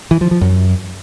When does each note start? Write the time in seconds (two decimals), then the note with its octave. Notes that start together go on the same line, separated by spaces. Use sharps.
0.11 E3
0.21 F3
0.31 F3
0.41 F#2